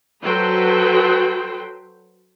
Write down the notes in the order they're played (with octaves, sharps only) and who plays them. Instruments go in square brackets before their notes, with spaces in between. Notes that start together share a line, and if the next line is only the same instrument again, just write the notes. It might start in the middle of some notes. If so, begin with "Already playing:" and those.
[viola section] F#3 F#4 A4 B4 C5 G5